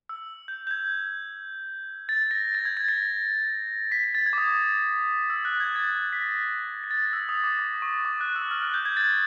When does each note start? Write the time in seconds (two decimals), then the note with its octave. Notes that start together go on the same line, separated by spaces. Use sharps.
0.09 E6
0.48 G6
0.67 G6
0.71 G#6
2.09 A6
2.31 A#6
2.55 A6
2.65 G#6
2.77 A6
2.88 A#6
3.92 B6
4.04 B6
4.15 A6
4.26 G#6
4.33 D6
4.38 D#6
5.30 E6
5.45 F#6
5.60 G#6
5.76 A6
6.13 B6
6.22 A#6
6.84 A#6
6.91 A6
7.13 E6
7.29 D#6
7.44 D6
7.59 D6
7.82 C#6
8.05 D6
8.21 F#6
8.36 E6
8.51 F6
8.62 F#6
8.74 G6
8.85 G#6
8.97 A6